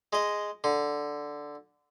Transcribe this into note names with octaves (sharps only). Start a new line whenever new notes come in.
G#3 D#5
D3